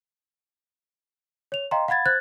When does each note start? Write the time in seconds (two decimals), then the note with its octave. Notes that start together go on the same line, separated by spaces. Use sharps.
1.52 C#5 F7
1.71 D#5 F5 G5 A#5 C6
1.88 F5 F#5 B5 G#6 A6
2.06 C5 F#6 G#6 A6